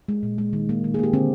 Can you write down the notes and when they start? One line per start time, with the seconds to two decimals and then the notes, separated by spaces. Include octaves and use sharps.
0.08 G#3
0.23 A#2
0.38 G#3
0.53 D#3
0.69 A#3
0.84 D#3
0.94 G#4
0.99 A#3 G4
1.13 D3 C4